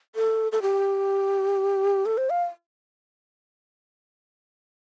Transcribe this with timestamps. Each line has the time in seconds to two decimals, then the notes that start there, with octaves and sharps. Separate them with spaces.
0.15 A4
0.52 A4
0.62 G4
2.06 A4
2.18 C5
2.30 F5